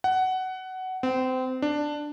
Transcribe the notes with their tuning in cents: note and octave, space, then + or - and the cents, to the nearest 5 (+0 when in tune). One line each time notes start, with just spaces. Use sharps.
F#5 +15
C4 -25
D4 +10